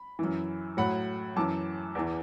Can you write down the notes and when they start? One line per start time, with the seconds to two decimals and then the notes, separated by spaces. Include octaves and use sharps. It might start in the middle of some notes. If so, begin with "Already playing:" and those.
Already playing: B5
0.19 F#2 E3
0.77 A2 F#3 F#5 B5
1.36 F#2 E3 A5 D6
1.95 E2 E3